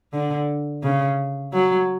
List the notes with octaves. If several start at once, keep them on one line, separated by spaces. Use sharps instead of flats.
D3
C#3
F#3